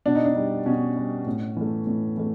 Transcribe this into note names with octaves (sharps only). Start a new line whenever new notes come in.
B2 D4
D#4
D4
G3
B2 C#4
G3
A2
E3 A3
A2
E3 A3